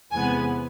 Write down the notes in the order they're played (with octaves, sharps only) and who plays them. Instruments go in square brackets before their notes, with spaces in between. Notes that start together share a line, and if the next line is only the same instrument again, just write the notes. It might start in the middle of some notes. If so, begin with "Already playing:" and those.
[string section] E2 C3 G#3 B3 G#5